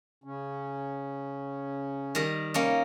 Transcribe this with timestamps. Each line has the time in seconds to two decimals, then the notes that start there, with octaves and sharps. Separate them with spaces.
0.24 C#3 C#4
2.15 D#3 G3 D#5
2.54 C3 G3 A#3 C#4 D#4